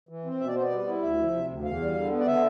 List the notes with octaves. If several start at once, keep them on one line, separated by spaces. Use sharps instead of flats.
E3
C4
B2 E5
D5
B3 C5
D5
G3
E4
D2 E5
F3
C3
D2
E2 F5
G3
D3
B3
D5
D3 E5